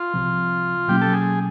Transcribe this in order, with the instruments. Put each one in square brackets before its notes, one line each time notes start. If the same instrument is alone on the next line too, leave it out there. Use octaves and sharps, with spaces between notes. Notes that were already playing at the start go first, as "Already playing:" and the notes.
Already playing: [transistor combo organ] F4
[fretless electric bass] C2 C3 F3
[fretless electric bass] B2 F#3 A#3 C#4 [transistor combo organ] G4
[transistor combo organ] A4
G#4